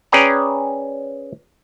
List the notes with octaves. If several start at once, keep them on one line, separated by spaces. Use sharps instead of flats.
C#4 G#4 B4 D5 G5 A#5